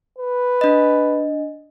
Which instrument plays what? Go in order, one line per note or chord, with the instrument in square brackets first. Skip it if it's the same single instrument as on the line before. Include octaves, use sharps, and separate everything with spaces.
[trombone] B4
[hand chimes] D4 D#5